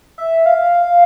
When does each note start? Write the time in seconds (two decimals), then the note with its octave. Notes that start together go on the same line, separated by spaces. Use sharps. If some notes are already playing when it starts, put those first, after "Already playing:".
0.18 E5
0.46 F5